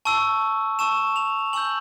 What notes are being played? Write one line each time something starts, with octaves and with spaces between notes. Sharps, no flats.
A5 C#6 E6
A5 C#6 E6 E7
F7
G#5 C#6 E6 G6 F#7